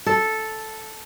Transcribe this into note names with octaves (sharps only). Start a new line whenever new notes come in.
A4